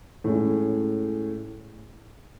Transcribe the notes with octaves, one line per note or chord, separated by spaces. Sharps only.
A2 G#3 C#4